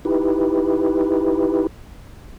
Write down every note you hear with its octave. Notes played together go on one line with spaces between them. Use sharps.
D#4 E4 G4 B4